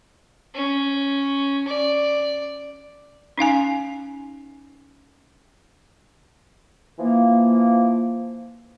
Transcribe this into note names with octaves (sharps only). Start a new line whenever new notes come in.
C#4
D5
C#4 D#4 F5 G#5
E3 F3 A#3